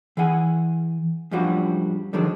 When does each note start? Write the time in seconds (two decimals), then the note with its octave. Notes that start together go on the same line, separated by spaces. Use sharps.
0.17 E3 G#4 F#5 G#5
1.31 F#2 A2 F3 G3 D4 F#4
2.13 D3 D#3 F3 F#3 G#3 D4